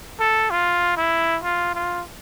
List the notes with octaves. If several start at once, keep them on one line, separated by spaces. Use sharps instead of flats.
A4
F4
E4
F4
F4